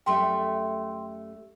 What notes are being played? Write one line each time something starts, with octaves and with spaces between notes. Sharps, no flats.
F#2 G3 A3 G5 C6